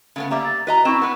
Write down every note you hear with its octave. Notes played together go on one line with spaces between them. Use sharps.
C#3 A3 B3
G3 A#3 E5 A#5 D6
A6
E4 F#4 B4 D#5 A#5 B6
C4 E4 C#6 E7
B3 B4